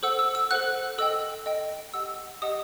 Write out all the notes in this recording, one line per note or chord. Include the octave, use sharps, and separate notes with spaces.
A4 C5 F#5 E6
E6
E6
A4 C5 F#5 F#6
A4 D#5 G5 E6
A4 D#5 G5
G4 D#5 F#5 E6
G4 D#5 F#5 D#6